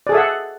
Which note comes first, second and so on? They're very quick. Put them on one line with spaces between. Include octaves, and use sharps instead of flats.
D5 G#4 A4 E5 F#5